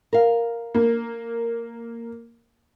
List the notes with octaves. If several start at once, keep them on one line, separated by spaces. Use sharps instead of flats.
A#4 F5
A#3